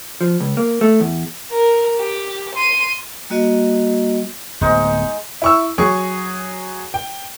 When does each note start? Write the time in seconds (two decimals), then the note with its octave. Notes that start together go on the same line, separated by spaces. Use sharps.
0.21 F3
0.40 C#2
0.57 A#3
0.81 A3
1.00 E2
1.50 A#4
1.97 G4
2.55 C6 D#7
3.30 G3 A#3 F#4 D#5
4.61 D1 G#3 B3 D#4
5.42 E4 C#6 E6
5.78 F#3 G#4 C#6
6.94 G5